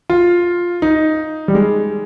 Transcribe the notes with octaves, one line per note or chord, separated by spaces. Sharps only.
F4
D#4
G3
G#3